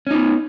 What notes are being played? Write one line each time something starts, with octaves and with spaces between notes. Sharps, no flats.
B3 C#4 D#4